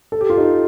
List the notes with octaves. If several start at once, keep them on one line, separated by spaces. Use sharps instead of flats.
A4
G4
F4
D#4 G4